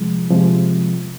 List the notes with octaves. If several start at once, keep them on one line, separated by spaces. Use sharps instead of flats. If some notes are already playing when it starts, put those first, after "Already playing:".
Already playing: C3 F3 G#3
C3 F3 G#3